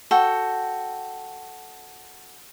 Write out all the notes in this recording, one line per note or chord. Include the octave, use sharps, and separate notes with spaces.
F#4 A4 G5